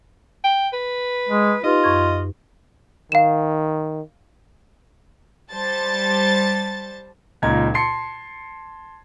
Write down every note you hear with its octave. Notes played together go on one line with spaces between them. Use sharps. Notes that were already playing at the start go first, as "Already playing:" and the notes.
G5
B4
G#3
D#4 F4 G4 B4 D#5
F#2 C#6 G#6
D#3 F5 E7
G3 C5 A5 A6
C#2 A#2 D#4 A#5 G#6
A5 C6 C7 C#7